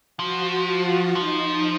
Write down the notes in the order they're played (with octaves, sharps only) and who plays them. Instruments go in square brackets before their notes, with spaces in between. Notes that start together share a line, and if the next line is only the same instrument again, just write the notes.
[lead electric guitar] F3 [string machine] F#4
[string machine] F4
[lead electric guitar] F3 [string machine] D#4